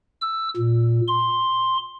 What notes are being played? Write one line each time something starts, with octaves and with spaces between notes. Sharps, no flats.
E6
A#2
C6